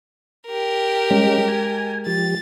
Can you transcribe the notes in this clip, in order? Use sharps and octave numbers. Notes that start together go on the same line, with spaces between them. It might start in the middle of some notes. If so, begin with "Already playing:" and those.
G4 A#4
G3 G#3 C#4
G#5
F3 G4 A6